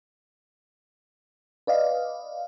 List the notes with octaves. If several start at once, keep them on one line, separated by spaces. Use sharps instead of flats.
B4 D5 D#5 F5